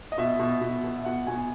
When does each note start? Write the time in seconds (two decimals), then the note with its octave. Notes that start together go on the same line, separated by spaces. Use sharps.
0.12 D#5
0.18 B2 E5
0.40 B2
0.61 B2
0.84 B2
0.98 E5
1.05 B2 F#5
1.27 B2 G#5